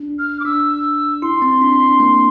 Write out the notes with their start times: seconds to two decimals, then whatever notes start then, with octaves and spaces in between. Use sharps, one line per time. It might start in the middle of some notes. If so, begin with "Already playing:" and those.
Already playing: D4
0.19 F6
0.40 D6
0.45 D4 E6
1.22 E4 C6
1.42 C4
1.61 D4
1.80 D4
2.00 A#3